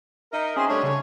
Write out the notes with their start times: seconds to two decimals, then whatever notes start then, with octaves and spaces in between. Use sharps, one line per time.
0.32 D#4 A#4 E5
0.57 C4 C#4 F#4 G#4 C6
0.69 D3 G3 A3 D4 C#5
0.83 C#3